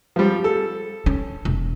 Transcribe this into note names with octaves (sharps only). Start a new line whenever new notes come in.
F3 G3
A4
C#4
E1